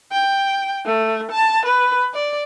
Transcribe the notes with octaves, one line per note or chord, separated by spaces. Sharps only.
G5
A3
A5
B4
D5